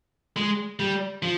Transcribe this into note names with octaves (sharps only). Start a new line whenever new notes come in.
G#3
G3
F3